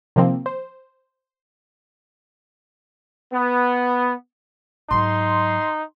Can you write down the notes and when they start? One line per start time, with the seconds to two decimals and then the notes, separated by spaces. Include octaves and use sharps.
0.16 C3 D#3 F3 A#3 C4
0.46 C5
3.33 B3
4.91 G#2 F#3 D#4 C6